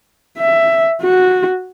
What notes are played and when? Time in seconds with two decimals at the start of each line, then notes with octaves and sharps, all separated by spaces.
0.38 E5
1.02 F#4